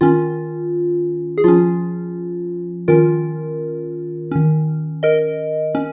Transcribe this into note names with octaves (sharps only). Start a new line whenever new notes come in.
D#3 C#4 F4
G#4
F3 C#4 F4
D#3 C#4 F4 A#4
D#3 C#4
A#4 D#5
C#4